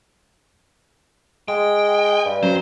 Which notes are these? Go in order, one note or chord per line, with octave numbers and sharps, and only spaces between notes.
G#3 G5
G2
F#3 C#4 C5 A#5